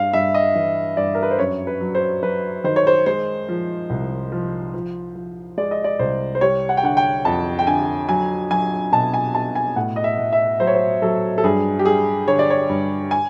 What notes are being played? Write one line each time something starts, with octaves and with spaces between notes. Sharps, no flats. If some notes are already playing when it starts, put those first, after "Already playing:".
Already playing: G2 F5
G2 E5
D#5
E3
G2 D5
A#4
B4
C5
F#2 C#5
B4
F#3
C5
F#3 B4
D#3 C5
C#5
C5
G#3 C5
F3
C2
F3
F3
F3
G#3 D5
D#5
D5
C2 C5
C5
G3 C#5
F#5
G5
D3 F#5
G5
F2 A5
G5
D3 G#5
F#3 G#5
F#3 G#5
B2 A5
G#5
B2 A5
G#5
A2 F#5
D#5
E5
A2
E5
F#3 C5
C#5
C5
F#3 A4
A4
G2 G#4
G4
G3 G#4
D3 C#5
D5
C#5
G2
G#5